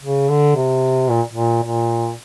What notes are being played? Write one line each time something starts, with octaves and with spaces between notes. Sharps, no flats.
C#3
D3
C3
A#2
A#2
A#2